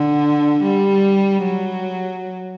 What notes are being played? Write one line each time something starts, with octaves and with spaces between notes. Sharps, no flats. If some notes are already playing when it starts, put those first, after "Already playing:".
Already playing: D3
G3
F#3